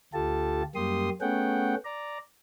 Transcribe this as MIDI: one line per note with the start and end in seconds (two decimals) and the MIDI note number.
0.14 0.63 38
0.14 0.63 65
0.14 0.63 67
0.14 0.63 69
0.14 0.63 81
0.75 1.10 42
0.75 1.10 55
0.75 1.10 58
0.75 1.10 67
0.75 1.10 84
0.75 1.10 87
1.21 1.75 57
1.21 1.75 59
1.21 1.75 61
1.21 1.75 68
1.21 1.75 78
1.21 1.75 79
1.85 2.18 74
1.85 2.18 82